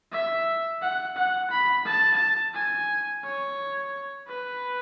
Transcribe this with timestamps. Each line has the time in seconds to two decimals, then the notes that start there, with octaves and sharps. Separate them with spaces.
0.12 E5
0.82 F#5
1.16 F#5
1.51 B5
1.85 A5
2.55 G#5
3.24 C#5
4.28 B4